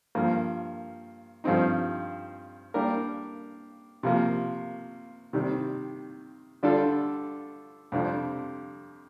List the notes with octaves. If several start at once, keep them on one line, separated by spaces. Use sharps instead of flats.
G2 F3 A#3
G2 F3 C4 D#4
G3 A#3 D4 G4 A#4
C3 F3 A#3
C3 D#3 G3
D3 G3 D4 F4 A4
F2 C3 G3 D4